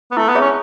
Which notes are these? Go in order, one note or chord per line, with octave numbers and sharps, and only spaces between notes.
B3
A3 E4
B3
G#4 C#5 E5
C#4